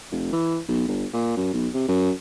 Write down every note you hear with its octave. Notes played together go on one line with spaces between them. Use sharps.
F1
E3
B1
G1
A#2
F#2
B1
C3
F#2